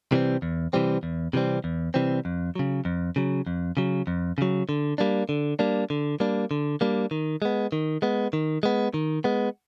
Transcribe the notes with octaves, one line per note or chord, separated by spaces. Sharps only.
C3 E3 G3 C4
E2
C3 E3 G3 C4
E2
C3 E3 G3 C4
E2
C3 E3 G3 C4
F2
C#3 F#3
F2
C#3 F#3
F2
C#3 F#3
F2
C#3 F#3
D3
G3 A#3 D4
D3
G3 A#3 D4
D3
G3 A#3 D4
D3
G3 A#3 D4
D#3
G#3 B3
D#3
G#3 B3
D#3
G#3 B3
D#3
G#3 B3